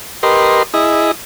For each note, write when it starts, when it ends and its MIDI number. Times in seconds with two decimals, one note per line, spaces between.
0.23 0.63 67
0.23 0.63 70
0.23 0.63 71
0.23 0.63 75
0.23 0.63 84
0.74 1.12 64
0.74 1.12 68
0.74 1.12 75